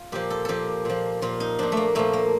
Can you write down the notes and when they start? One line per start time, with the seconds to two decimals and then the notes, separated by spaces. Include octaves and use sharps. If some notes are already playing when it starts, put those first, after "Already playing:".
Already playing: F4
0.12 A#2 F3 G4
0.30 A4
0.45 A#2 F3 G4 A4
0.85 A#2 F3
1.22 A#2 F3 F4
1.40 D#4
1.59 A#2 F3 D4
1.72 A3
1.77 A#3
1.95 A#2 F3 A3
2.13 A#3